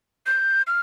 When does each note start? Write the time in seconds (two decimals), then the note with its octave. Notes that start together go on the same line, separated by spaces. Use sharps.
0.26 G6
0.67 F6